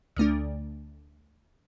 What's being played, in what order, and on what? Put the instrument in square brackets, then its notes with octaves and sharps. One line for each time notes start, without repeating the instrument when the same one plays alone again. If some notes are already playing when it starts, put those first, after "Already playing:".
[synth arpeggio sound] D2 D3 A3 D4